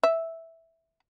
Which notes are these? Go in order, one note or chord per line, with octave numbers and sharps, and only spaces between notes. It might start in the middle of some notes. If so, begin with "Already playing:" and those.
E5